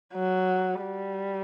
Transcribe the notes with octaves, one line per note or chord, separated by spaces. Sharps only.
F#3
G3